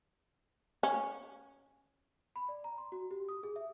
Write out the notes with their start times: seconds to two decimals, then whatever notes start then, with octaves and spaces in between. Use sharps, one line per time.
0.83 C#4
2.36 B5
2.49 D5
2.64 A#5
2.78 C6
2.92 F#4
3.11 G4
3.29 D#6
3.43 G#4
3.56 E5